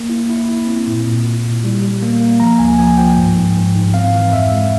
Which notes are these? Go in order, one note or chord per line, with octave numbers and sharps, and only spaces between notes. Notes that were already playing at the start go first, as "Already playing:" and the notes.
Already playing: A#3
E4
E4
E4
C4
A#2
A#2
E4
A#2
G3
G3
A#3
A#3
F3 A#5
C#2 G#5
F3 G#5
F3 G5
G#2
G#2
G#2
G#2
C4 F5
E3
F2 E5
G#3